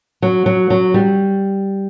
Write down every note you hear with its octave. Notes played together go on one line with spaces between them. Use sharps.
F#3
F#3
F#3
G3